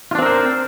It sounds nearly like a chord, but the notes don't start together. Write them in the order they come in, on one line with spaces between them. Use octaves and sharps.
F4 D4 C4 A#4 C5